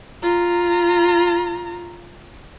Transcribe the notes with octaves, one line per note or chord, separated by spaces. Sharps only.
F4 A#5